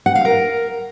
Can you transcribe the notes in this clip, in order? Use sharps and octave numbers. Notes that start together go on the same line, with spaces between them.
F#5
F5
A#4